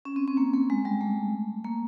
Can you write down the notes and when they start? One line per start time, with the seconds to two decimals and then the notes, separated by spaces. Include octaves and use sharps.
0.05 C#4
0.16 C4
0.28 C4
0.37 A#3
0.54 A#3
0.70 G#3
0.85 G3
1.01 A3
1.64 A#3